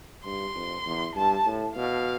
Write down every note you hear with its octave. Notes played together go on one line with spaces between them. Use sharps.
G2 C6
F2
E2
G2 A5
A2
B2 F5